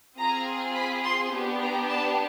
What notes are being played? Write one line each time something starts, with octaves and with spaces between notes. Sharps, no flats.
C4 F4 G#4 A#5
B5
C6
B3 D4 G4
A#5
A5